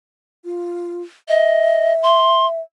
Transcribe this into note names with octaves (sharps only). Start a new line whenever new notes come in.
F4
D#5 E5
C6